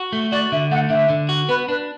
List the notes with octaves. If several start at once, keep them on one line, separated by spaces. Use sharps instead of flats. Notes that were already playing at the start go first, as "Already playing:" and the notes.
Already playing: F#4
A3
F#4 D5
D3 E5
A3 F#5
D3 E5
D3
F#4
B3 B4
D4 B4